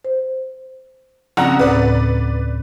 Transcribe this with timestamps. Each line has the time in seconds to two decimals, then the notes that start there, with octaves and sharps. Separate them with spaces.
0.05 C5
1.37 A#1 C#3 C4 C#4 F#5 A#5
1.59 D2 A2 B4 D5 D#6